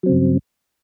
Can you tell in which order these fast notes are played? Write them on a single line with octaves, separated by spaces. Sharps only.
F#3 C4 C#3 G2